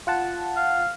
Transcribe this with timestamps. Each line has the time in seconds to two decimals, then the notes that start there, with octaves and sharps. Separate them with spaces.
0.07 F4 F#5 A5
0.56 F5